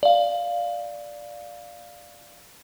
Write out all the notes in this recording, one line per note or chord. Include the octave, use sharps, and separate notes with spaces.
D5 F5